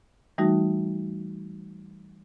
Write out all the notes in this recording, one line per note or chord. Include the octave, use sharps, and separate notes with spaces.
E3 G3 A3 D#4 F#4